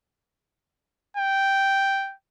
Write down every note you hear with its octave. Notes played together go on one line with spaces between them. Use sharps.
G5